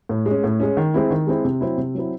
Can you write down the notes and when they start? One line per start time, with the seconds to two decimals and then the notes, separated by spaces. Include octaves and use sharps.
0.09 A2
0.26 G#3
0.31 C#4
0.44 A2
0.60 G#3 C#4
0.77 D#3
0.94 G#3 C4 E4
1.11 D#3
1.27 G#3 C4 E4
1.45 C3
1.61 F#3 C4 E4
1.78 C3
1.95 F#3 C4 E4